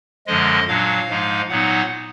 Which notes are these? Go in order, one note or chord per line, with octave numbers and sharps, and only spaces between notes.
F#2 D3 F3 G#3 D#5
A#2 F#3 D4 F5
G#2 F3 G#3 D#4
A#2 F#3 B3 D#4 F#5